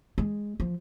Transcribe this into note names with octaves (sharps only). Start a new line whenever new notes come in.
G#3
F3